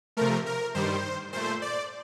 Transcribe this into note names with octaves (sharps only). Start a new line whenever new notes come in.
C3 F3 A3 A#4
A#4
G2 D#3 G3 C5
A#2 A3 C5
D5